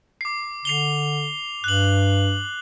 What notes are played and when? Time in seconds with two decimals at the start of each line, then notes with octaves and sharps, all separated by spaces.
0.21 D6 C7
0.65 D3 C7 F7 G7
1.64 G2 F#6 F#7